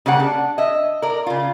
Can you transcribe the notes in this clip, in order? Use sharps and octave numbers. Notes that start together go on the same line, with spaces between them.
C#3 G3 A#3 F#5
D4
D#5 E5
A#4 D5
C#3 F4